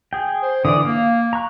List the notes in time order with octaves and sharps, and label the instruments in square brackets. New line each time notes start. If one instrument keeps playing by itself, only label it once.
[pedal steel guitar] G#4 G5
[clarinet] C5
[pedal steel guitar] D3 E3 D5 [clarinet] D#6
[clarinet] A#3 [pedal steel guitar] F5
[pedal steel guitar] A#5 C#6 F#6